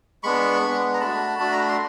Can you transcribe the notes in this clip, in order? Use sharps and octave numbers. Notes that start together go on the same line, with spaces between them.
G#3 B3 D4 B5 C#6
G#3 B3 D4
A#5
A3 D4 F#4 A5 B5
A3 D4 F#4
A#5
B5
C6